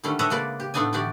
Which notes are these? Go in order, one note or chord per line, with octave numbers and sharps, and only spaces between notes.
D3 D#3 G3 A3 C#4
A4 B4 C#5 D#5 E5 F#5
C#3 G#3 A#3 B4 D5
G4
A2 A3 B3 D4 D#4 G#5
D3 E3 F#4 G4 D5